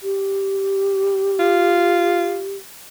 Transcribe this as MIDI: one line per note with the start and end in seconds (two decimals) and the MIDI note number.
0.03 2.54 67
1.39 2.43 65